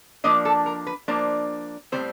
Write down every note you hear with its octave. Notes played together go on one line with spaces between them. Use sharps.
F3 A#3 D4 D#5
A4
A#4
B4
F3 A#3 D4 C5
A2 E3 G3 C4 C5